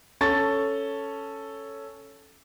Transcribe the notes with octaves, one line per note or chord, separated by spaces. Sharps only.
C#4 A4 C#6 A6